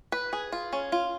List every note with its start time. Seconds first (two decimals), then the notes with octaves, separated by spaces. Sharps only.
0.12 B4
0.33 G#4
0.52 F4
0.73 C#4
0.92 F4